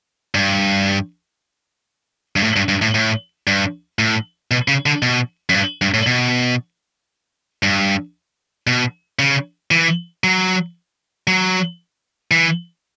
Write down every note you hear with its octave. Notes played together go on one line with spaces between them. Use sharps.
G2
G2
A2
G2
G2
A2
A2
G2
A2
B2
C#3
D3
B2
F#2
G2
G2
A2
B2
G2
B2
C#3
E3
F#3
F#3
E3